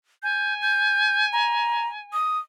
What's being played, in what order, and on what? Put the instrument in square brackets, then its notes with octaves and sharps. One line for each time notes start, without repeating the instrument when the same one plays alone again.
[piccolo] G#5 [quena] G6
[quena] G6
A#5
D#6